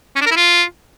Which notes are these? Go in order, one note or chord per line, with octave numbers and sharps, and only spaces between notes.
C#4
D4
A#4
E4
F4